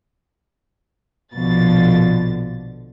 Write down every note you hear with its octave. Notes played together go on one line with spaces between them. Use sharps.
A#1 B2 D3 F3 A6